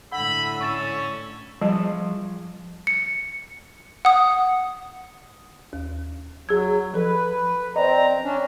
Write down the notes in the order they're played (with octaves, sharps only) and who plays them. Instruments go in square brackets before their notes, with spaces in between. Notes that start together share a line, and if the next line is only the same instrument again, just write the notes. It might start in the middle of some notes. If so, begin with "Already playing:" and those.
[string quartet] A2 D3 [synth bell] F#5 [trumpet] B5 [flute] E6
[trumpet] C#4 [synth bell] C#6 A6 E7
[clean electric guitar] F3 G#4 A5 [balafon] G3
[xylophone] C#7
F#5 D#6
[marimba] D#2
[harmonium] F#3 [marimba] G#4 E6 G#6
[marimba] F3 A4 [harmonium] B4
[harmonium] C4 A#5 [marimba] D5 D#5
[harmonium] C#4 D4